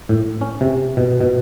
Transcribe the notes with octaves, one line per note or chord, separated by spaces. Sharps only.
A2
C#4
C3
B2
B2